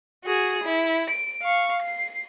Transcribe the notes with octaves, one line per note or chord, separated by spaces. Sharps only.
F#4 G#4
E4
D7
F5 C#6
C7